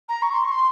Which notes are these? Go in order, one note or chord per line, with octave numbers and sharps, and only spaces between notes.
A#5
C#6
C6
C#6
C6